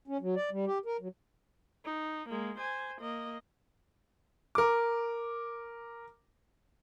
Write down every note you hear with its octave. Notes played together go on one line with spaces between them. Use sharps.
C#4
F#3
D5
G3
G4
A#4
F#3
D#4
G#3 A#3
C5 G#5
A#3 D#5
A#4 D6